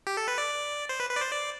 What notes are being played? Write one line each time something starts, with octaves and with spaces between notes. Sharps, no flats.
G4
A4
B4
D5
C5
B4
B4
D5
C5
D5